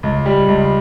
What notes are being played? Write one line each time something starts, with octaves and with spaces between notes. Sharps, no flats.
C#2
G3
C#2